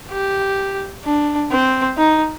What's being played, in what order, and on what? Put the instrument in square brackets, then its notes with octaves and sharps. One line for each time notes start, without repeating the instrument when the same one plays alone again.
[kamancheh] G4
D4
C4
D#4